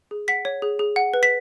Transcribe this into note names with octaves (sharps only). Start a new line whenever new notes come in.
G#4
F#5 B6
C#5
G#4
G#4
F#5
B4
B6